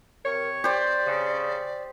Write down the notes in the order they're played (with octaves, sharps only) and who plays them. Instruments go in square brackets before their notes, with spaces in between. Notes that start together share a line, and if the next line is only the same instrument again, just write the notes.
[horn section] C3 C#5 [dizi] A#4
[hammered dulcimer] G4 C5 [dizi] D5
[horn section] C#3